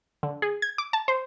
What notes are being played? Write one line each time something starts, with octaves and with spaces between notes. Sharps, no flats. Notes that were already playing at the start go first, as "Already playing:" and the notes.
D3
G#4
G#6
D6
A5
C5